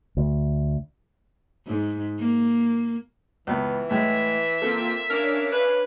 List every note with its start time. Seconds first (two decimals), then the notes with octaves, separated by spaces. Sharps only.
0.17 D2
1.67 G#2
2.19 A#3
3.47 C#2 E3 B3
3.91 A2 G#3 E5
4.62 A#3 C4 F4 A4
5.10 C#4 D4 A#4 F5
5.52 B4